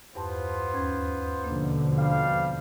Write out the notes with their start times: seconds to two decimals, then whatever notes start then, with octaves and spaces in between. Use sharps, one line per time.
0.15 E2 G2 B3 F4 C5 A5
0.73 D#2 C#4 G#6
1.44 B2 D3 F3 A#3 D4
1.98 G3 F5